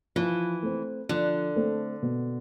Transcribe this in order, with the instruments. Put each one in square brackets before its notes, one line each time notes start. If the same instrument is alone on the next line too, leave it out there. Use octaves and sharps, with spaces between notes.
[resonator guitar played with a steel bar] E3 [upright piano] F3
[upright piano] A3 C4
[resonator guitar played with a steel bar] D3 [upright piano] F3
[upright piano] A3 C4
B2